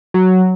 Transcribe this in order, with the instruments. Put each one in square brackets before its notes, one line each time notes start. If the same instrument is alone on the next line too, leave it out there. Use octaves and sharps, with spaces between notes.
[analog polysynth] F#3